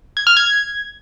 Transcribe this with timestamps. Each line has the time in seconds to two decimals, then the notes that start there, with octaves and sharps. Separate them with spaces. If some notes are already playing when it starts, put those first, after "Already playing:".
0.17 G#6
0.27 F6
0.37 G#6